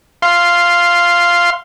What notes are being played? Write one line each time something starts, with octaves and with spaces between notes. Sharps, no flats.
F5 C6